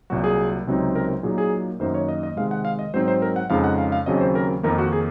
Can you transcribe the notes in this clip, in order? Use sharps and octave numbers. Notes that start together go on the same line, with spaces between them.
C2 A#2 F#3 F#4
G#4
C#2 C3 F#3 C4 D#4
A#4
A#2 F#3 A#3 D#4 G#4
G#4
F#2 D#3 A#3 D#4 C5
C#5
D#5
D#5
C3 D#3 G#3 F5
F#5
F5
D#5
G#2 F#3 C4 D#4 C5
C5
A#4
F#5
F2 C#3 G#3 D#4 F5
F#5
F5
F5
D#2 C#3 F#3 C4 D#5
C5
A#4
F2 D#3 A#3 D#4 A#4
F#4
G#4